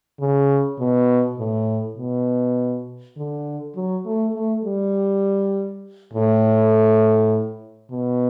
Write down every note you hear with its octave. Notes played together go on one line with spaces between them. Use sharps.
C#3
B2
A2
B2
D3
F#3
A3
A3
G3
A2
B2